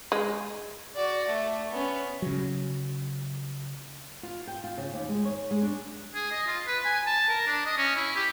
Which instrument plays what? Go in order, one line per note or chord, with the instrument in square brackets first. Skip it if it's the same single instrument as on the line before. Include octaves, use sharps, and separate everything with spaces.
[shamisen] G#3
[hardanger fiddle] F#4 D5
A3
B3 C#4
[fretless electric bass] C#3 F#3
[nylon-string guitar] F4
G5
F4
C#3
D#2
G#3
C#5
G#3
D4
[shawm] G#4
D#5
F4
B4
G#5
A5
A#4
D4
D#5
C#4
E4
G4